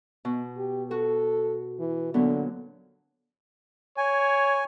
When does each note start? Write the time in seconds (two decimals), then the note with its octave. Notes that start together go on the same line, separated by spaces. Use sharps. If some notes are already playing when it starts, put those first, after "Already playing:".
0.25 B2
0.57 G4
0.91 F#4 A4
1.79 E3
2.14 A#2 D3 F#3 B3
3.97 C#5 G#5